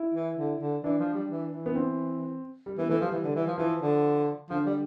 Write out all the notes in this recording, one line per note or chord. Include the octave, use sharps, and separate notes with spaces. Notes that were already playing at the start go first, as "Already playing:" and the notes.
Already playing: E4
E3
D3
D3
E3 D4
F3
G3
E3
E3
B3
C4
G3
E3 B3
E3 A3
F3 G3
E3
D3
E3
F3
E3 F3
D3
D3 F3
G3